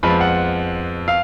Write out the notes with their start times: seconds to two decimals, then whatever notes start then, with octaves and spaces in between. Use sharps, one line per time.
0.03 F2 F3 G#3 B3 B5
0.21 F#5
1.08 F5